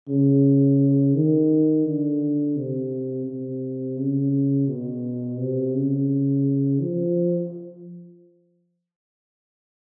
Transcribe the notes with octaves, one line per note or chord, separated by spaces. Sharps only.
C#3
D#3
D3
C3
C3
C#3
B2
C3
C#3
F3